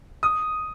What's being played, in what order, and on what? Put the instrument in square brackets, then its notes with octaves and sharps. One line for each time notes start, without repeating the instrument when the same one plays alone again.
[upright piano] D#6